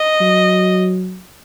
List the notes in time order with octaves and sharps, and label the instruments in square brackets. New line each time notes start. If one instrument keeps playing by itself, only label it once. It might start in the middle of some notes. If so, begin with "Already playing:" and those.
Already playing: [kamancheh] D#5
[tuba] F#3